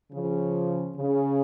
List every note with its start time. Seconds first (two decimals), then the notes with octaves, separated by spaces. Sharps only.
0.12 C#3 F3
0.97 C#3